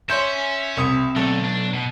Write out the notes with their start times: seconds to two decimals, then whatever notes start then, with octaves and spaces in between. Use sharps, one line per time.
0.10 C#4 C#5 E5 G#5 C6 G6
0.77 C2 C4 D#6
1.16 B1 D3 A3
1.44 D4
1.74 B2 D#5